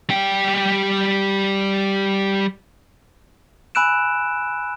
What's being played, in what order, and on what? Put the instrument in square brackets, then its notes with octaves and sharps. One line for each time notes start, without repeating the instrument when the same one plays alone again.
[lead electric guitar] G3 G5
[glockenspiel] G#5 B5 E6 F#6 D7 E7